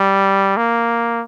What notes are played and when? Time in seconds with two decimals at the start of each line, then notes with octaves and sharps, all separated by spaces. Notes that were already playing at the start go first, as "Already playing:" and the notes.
Already playing: G3
0.57 A#3